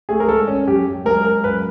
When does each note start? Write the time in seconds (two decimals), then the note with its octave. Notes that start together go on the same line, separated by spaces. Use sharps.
0.09 A3 G#4
0.20 A#4
0.28 G#3 A4
0.48 C#4
0.67 F#2 G4
0.86 F#2
1.05 G#3 A#4
1.25 G#3 A#4
1.44 F#2 B4